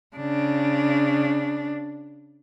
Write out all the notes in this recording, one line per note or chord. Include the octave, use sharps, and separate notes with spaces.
C#3 D4